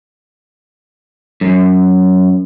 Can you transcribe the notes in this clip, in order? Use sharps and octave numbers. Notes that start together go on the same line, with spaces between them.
F#2